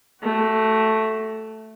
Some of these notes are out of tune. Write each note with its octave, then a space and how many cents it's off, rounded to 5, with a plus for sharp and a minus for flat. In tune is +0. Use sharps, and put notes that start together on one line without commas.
A3 +0 F#4 +35